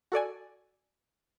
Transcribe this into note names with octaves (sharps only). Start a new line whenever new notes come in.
F#4 A4 D5 G#5